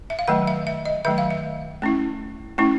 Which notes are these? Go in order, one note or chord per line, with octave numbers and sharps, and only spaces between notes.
E5
F5
D#3 F#3 A3 F#5
E5
E5
D#5
D#3 F#3 A3 E5
F5
E5
A3 C#4 E4
A3 C#4 E4